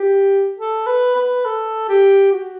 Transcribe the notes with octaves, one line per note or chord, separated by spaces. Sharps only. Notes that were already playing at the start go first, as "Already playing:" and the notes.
Already playing: G4
A4
B4
B4
A4
G4
F#4